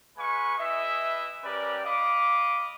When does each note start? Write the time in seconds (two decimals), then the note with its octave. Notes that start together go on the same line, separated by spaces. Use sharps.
0.18 G#3 B4 F5 G#5 B5 C#6
0.58 E4 G#4 B4 D#5 E5
1.44 G3 C#4 G4 A#4 B4 D5
1.85 D#5 F5 B5 D6